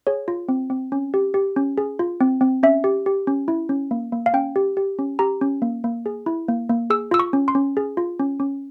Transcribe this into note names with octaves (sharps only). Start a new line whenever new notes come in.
G#4 C#5
F4
C4
C4
C#4
G4
G4
C#4
G#4
F4
C4
C4
C#4 E5
G4
G4
C#4
E4
C#4
A#3
A#3
F5
C#4 G5
G4
G4
C#4
G4 A#5
C#4
A#3
A#3
G#4
E4
A#3
A#3
G#4 E6
F4 E6
C#6
C#4
C6
C#4
G#4
F4
C#4
C#4